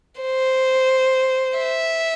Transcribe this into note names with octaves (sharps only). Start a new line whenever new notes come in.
C5
E5